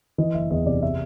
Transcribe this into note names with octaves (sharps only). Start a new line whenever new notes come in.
E3 D#5
F#1 E5
E2 D#5
C3 D5
E5